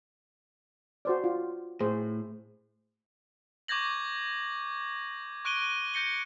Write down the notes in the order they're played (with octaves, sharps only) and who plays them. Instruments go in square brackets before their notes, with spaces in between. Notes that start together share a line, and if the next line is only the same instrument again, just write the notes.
[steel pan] F#4 C5 D5
F4
[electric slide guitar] A2 [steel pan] G#4 C5
[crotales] C#6 D6 G6 G#6 A#6 F#7
C#6 F#6 D7 D#7 G7
G6 A#6 C#7 G7